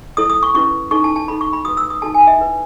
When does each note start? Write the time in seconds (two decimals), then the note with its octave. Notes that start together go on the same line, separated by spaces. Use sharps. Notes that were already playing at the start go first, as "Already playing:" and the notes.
0.17 E4 A4 C#5 D#6
0.30 D#6
0.43 C#6
0.54 C#4 E4 B4 C#6
0.91 D#4 A4 C#5 C#6
1.04 A5
1.16 A5
1.28 D#4 A4 C#5 B5
1.41 C#6
1.53 B5
1.65 F#4 B4 D#6
1.77 E6
1.90 D#6
2.02 D#4 F#4 A4 A5
2.14 G#5
2.27 E5
2.38 E4 B4